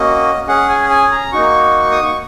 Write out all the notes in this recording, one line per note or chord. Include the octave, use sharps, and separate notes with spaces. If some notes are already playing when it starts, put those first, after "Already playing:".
Already playing: A#3 C#4 F#4 D#5
C#4 G#4 F#5
G#5
G#5
A#5
A#3 D#4 F#4 C#6
D#6
C#6